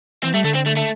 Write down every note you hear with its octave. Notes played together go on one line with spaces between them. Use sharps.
E3 C4
G3 A3
D3 A3
C4
A3
A3